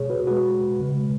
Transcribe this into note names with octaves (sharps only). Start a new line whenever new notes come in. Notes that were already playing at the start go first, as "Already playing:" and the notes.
Already playing: B2 G#3 G#4 C#5
F#4 B4
B2 G#3 F#4 B4
C#3 G#3